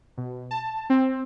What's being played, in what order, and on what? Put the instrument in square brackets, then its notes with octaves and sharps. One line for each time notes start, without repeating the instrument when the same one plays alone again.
[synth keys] B2
A5
C4